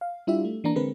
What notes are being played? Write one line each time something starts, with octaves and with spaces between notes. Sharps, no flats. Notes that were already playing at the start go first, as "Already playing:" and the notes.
F5
G3 D4 E4 F4 G4 E5
A3
E3 A#3 D4 A#5
D3 G#3 C4 A#4 B4